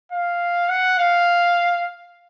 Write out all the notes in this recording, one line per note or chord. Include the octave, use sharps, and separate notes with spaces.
F5
F#5
F5